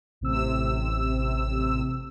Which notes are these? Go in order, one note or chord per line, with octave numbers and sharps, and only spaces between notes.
A1 C3 E6